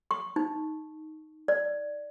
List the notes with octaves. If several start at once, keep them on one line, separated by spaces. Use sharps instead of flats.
C#6
D#4
D5